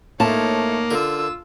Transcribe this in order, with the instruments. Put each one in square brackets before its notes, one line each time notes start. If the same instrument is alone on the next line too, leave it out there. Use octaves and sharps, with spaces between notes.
[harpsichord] A2 F3 [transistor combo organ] A#3 [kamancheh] D#4 C#5 [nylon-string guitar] A5
[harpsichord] D3 A#4 [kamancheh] F4 E6